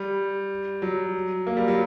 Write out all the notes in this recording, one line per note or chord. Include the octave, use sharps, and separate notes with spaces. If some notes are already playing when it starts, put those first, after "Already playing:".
Already playing: G3
F#3
A#3
G3
F#3